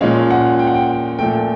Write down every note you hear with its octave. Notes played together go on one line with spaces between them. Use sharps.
A#2 F3 G#3 C#4 F5
F#5
G5
F#5
G5
A#2 F3 A3 G5